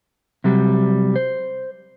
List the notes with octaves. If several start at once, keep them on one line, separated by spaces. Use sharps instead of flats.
C3 F#3 G3
C5